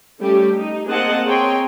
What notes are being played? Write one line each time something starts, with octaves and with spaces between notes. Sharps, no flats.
G3 A3 C#4 G4
D#4
A#3 C4 G#4 D#5 F#5 A5
C4 G#4 C#5 G5 A#5 C6